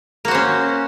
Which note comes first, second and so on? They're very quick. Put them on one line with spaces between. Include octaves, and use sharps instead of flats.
A#3 F#4 C5 C#4